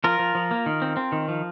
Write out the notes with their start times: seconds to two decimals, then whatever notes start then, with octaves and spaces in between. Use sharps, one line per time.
0.04 F3 F4 A#4
0.19 F3
0.35 F3
0.51 A#3
0.66 D#3
0.82 C4
0.97 C4
1.12 D#3
1.29 F3